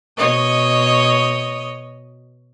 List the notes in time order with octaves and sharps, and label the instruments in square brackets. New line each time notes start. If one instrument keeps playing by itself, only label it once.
[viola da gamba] B2 C#5 D#5